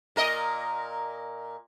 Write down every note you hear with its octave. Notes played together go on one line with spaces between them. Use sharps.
A#2 A#4 D#5